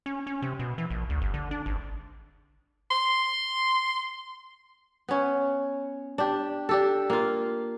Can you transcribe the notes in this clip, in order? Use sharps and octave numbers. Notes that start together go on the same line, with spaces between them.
C#4
C#4
C3
B2
E3
A#1
D2
G1
D3
D4
G#1
C6
B3 C#4
D4 G4
D4 G4 A4
A#3 F4